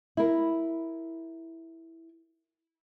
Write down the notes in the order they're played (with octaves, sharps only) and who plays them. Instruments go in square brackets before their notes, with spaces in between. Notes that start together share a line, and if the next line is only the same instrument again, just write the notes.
[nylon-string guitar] E4 A#4